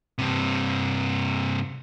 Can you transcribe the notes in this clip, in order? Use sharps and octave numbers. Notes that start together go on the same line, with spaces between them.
G2 C3